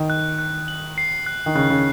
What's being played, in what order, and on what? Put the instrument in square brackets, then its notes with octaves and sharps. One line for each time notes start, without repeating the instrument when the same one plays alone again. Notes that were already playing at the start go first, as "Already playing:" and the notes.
Already playing: [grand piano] D#3
[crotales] F#6
F#6
F#7
C7
F#6
[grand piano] D#3
[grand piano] C#3 [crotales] F#6
[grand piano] C#3